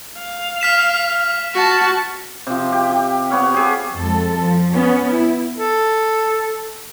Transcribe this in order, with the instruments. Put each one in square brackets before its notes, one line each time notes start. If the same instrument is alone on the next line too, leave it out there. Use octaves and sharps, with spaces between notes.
[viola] F5
[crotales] F6 B6 E7
[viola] F#4 A5
[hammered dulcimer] C3 F3
G4
G4
B3 C#5 F5
G4 G#4
[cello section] F2 G#3 A4
F3
B3 C#4
E4
[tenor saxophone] A4